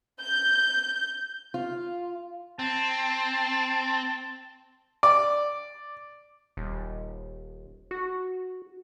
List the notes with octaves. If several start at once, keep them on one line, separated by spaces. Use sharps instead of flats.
G6
F4
C4 A5
D5
D#1
F#4